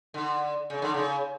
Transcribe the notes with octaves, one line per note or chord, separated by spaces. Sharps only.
D3
C#3
D3
C#3